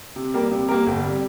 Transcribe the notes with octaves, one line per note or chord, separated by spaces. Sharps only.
C3
G3 A#3 G4 A#4
C3
G3 A#3 G4 A#4
G1
C3 G3